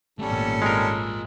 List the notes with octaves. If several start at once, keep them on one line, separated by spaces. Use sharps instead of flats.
G#1 F2 A#2 G3 A3 B3 C#4 A4
G#3 F4 A#4 D#5